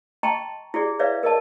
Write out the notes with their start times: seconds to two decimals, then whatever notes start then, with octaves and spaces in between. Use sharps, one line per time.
0.23 D#5 G5 A5 A#5 C6 C#6
0.74 E4 G4 G#4 D5
0.99 B4 C#5 D5 E5 F5
1.23 A#4 D#5 A5